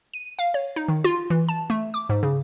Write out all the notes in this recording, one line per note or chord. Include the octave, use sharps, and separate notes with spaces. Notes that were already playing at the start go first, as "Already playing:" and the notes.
D#7
F5
C#5
D#4
D#3
F4
E3
A5
A3
D6
G#2
C#3